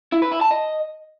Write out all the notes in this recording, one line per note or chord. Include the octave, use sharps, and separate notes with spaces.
E4
B4
E4
A5
D#5